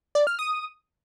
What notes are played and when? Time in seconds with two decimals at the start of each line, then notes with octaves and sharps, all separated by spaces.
0.15 D5
0.27 F6
0.39 D#6